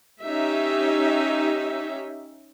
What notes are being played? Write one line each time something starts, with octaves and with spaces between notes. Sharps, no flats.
C#4 D#4 G4 E5